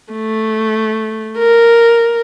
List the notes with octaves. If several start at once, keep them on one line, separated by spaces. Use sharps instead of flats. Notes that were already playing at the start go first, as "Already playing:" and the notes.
A3
A#4